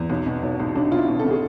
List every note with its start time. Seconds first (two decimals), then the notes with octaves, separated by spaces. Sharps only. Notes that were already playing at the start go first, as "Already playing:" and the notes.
Already playing: E2
0.09 B1
0.26 B2
0.43 B1
0.60 B1
0.75 B1 D4
0.91 B1 F4
0.98 E4
1.08 B2
1.19 A4
1.25 B2
1.31 G#4